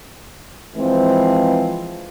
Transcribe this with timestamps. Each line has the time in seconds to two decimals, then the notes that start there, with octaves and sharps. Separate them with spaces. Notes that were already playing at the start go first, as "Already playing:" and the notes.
0.77 E3 F3 G#3 C4